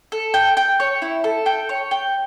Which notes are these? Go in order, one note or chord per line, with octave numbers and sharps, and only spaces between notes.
A4
G5
G5
C#5
E4
A4
G5
C#5
G5